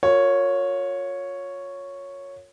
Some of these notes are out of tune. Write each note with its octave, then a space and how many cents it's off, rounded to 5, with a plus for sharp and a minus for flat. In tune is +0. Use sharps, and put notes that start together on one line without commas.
F4 +35 A#4 -30 C#5 +0